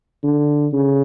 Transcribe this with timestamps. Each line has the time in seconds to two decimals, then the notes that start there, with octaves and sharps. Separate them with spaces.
0.24 D3
0.73 C#3